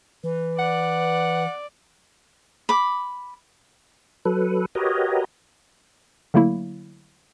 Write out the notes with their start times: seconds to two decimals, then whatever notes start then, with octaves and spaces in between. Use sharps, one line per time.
0.24 E3 B4
0.59 D5 F#5
2.69 B5 D6
4.25 F#3 A4 B4
4.75 F#4 G4 A#4 B4 C#5 D#5
6.34 D3 F#3 A3 A#3 E4